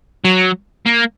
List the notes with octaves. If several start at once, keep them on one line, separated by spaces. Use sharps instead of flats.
F#3
A#3